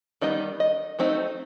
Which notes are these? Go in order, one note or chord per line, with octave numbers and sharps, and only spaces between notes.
D#3 G3 B3 D#4 D#5
D#5
F#3 A3 C4 D#4